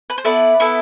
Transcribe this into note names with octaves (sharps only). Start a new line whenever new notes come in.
B4
C5
B3 E4 A4 B4 D5
B3 E4 A4